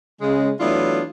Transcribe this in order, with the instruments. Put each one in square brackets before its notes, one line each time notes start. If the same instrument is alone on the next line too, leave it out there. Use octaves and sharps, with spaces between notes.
[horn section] C#3 G#3
E3 F#3 A3 B3 D4 F4